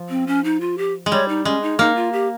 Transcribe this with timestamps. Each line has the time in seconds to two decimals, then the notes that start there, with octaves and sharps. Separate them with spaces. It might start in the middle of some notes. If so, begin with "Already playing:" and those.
Already playing: F3
0.10 C4
0.27 C#4
0.44 D#4
0.61 F4
0.78 G4
1.06 G#3
1.12 G3 C#5
1.29 D#4
1.45 G#3 C#4
1.62 D#4
1.79 A#3 D#4
1.96 F4
2.13 G4